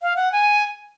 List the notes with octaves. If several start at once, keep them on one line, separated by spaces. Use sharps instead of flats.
F5
F#5
G#5